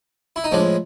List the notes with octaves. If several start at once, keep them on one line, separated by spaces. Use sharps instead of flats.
E4
D#4
A2 F3 G#3 D4